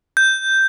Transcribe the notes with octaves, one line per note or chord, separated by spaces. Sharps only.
G6